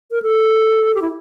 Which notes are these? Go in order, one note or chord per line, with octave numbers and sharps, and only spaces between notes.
A#4
A4
G4
E4